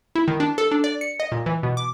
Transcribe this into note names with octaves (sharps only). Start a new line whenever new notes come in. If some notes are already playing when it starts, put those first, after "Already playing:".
E4
D#3
D4
A4
D4
D5
C#7
D#5
A#2
E3
B2
D6